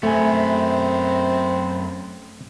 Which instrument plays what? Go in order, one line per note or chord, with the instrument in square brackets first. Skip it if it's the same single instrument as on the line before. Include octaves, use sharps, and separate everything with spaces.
[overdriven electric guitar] F#2 B3 [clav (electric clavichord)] A3 G#5 [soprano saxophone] C4